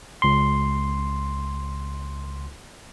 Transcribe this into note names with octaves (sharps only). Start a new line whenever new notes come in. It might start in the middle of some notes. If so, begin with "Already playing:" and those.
C#2 C6